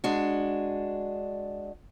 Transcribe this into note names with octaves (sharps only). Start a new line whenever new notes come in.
G#3 D4 F#4